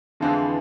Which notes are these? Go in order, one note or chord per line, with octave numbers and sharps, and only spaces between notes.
F2 D3 E3 F3 G#3